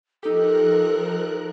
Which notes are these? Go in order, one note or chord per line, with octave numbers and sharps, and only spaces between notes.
F3 D#4 G4 A4 A#4 F#6